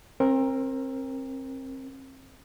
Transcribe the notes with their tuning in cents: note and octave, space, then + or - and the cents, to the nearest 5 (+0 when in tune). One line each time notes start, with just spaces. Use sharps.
C4 +30 A#4 +0